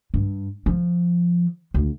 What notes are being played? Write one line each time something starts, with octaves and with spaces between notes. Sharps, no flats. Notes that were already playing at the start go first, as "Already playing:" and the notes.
G2
F3
D2